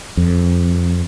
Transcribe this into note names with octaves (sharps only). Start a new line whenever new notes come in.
F2